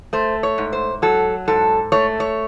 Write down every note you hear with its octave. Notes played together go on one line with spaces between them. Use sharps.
A3 C5
C#5
G#2
C5
F#3 A4
G#2 A4
A3 C#5
C#5